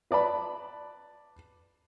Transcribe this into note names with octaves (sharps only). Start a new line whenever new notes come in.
B4 D5 A5 B5